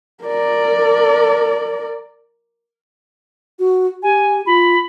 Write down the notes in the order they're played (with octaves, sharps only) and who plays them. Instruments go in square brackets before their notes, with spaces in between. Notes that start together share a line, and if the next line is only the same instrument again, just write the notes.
[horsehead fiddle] A#4 D5
[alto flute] F#4
[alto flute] G4 [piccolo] G#5
[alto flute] F4 [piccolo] B5